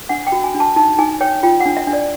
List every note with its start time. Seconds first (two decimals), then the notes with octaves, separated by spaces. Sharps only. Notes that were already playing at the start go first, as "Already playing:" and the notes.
0.09 D4 F#5
0.27 G5
0.32 F#4
0.44 G#5
0.55 D4
0.60 A5
0.76 D#4 A5
0.98 D#4 G#5
1.21 C#5 G5
1.43 F4 G5
1.60 F#5
1.66 D4
1.77 E5
1.87 D4
1.93 D5